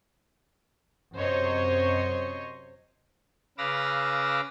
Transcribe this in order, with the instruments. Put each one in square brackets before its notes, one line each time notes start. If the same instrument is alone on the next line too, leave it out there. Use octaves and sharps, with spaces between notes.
[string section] F#2 C3 C5 C#5 D#5 C#7
[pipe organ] C#3 B4 F5 D6 E6 A#6